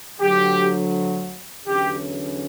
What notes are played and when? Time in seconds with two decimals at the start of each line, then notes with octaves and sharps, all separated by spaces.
0.20 D2 D3 F#3 G4
1.67 E2 D3 F#3 C#4 G4